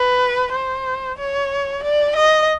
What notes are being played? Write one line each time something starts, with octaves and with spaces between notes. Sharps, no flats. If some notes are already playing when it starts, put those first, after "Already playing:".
Already playing: B4
C5
C#5
D5
D#5